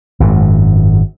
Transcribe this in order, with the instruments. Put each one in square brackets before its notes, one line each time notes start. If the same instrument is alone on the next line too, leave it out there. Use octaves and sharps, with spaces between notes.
[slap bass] G#1 F#2